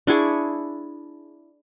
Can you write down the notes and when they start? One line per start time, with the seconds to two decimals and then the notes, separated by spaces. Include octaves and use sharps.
0.07 D4 E4 G#4 C#6